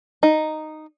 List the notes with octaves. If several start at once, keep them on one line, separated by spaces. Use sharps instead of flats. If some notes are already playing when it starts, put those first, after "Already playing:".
D#4